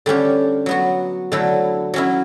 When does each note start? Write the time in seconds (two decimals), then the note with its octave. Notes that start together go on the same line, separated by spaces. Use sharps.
0.06 D3 G3 C#4 G4
0.66 F#3 B3 F#4
1.32 D3 F#3 A3 E4
1.94 F#3 C#4 E4